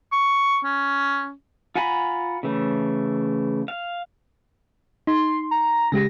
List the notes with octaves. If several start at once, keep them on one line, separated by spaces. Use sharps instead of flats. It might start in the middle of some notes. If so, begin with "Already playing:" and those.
C#6
C#4
F4 F#5 G#5 A#5 B5
C#3 E3 A3
F5
D#4 C6
A#5
C#3 G#3 G4 A#6